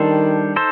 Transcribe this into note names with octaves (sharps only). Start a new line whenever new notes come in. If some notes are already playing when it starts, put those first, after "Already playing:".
Already playing: D#3 G3 D4 A4 C5
D#4 A4 C5